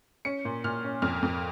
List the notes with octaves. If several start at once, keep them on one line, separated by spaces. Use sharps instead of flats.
C#4 C#7
A#2
A#2 F6
C#4
F2 F6
F2